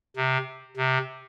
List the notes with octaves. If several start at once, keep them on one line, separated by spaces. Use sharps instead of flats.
C3
C3